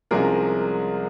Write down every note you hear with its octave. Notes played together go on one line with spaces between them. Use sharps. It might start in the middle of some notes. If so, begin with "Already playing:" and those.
C2 C3 F3 G#3 C#4 G#4 A#4